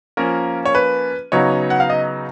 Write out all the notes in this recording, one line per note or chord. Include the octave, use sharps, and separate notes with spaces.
F3 A#3 C#4 A#4
C#5
B4
C#3 F#3 B3 D#4 C#5
F#5
F5
D#5